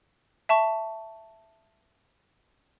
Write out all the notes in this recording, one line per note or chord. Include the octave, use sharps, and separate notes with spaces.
E5 A5 C#6